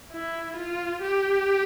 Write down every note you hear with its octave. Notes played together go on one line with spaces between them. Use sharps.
E4
F4
G4